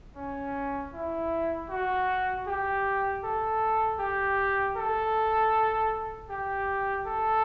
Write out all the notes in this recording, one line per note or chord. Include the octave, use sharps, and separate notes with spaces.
C#4
E4
F#4
G4
A4
G4
A4
G4
A4